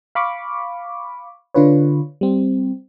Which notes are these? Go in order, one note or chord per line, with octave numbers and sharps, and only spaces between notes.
F5 B5 C#6 D6
D3 D4 F4 B4 C#5
G3 C4